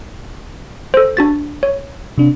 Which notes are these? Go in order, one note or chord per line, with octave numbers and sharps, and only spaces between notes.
A4 C5
D4 F#4 A6
C#5
C3 D4